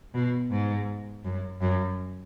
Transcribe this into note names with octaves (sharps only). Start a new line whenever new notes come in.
B2
G#2
F#2
F#2